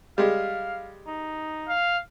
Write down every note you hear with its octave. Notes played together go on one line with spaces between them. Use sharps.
G3 G#3 F5
D#4
F5